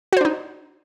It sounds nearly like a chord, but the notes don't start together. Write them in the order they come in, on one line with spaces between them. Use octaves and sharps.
F#4 C5 D4 D#4